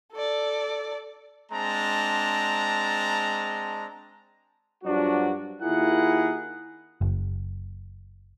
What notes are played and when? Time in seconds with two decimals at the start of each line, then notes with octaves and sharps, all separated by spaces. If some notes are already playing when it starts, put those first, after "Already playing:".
0.12 A4 D5
1.51 G#3 C4 D4 A5 A#5
4.84 G2 F3 F#3 D4 F#4
5.62 D#2 E4 F4 G#4 A#4 F#5
7.01 F#1